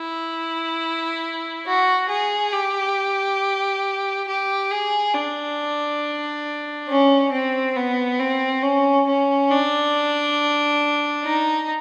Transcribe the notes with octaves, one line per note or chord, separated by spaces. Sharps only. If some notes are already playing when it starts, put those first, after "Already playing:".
Already playing: E4
F#4
G#4
G4
G4
G#4
D4
C#4
C4
B3
C4
C#4
C#4
D4
D#4